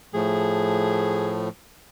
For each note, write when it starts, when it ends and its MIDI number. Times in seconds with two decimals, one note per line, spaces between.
0.14 1.49 45
0.14 1.49 53
0.14 1.49 57
0.14 1.31 68